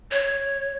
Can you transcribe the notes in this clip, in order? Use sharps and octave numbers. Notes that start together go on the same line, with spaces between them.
C#5